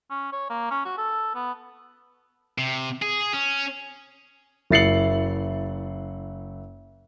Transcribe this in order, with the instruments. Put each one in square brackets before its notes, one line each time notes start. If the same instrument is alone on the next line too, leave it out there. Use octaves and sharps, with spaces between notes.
[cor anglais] C#4
C#5
A#3
C#4
F#4
A4
B3
[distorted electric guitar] C3
G#4
C#4
[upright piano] F#1 E4 A6 C7 C#7 F#7